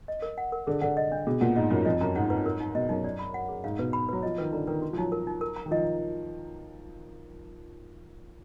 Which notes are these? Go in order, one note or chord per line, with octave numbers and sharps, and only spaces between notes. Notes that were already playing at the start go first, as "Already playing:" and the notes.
D#5
A#4
F#5
A#4
D3 G#4
D3 F#5
D#5
D4
B2 G#4
A#2 F#5
G#2 D#5
F#2 F4
F2 D#5
F#2 A#5
G#2 F#5
B4
A#4
D#4
B2 D#5
F#2 D#4
D5
B5
F#5
G#4
G#2 F5
B2 B4
B5
F#3 B4
F3 D#5
D#3 B4
D3 A#5
D#3 B4
F#4
F3
F#3 D#4
A#4
D#4
A#4
A#5
D#3
F3 D#5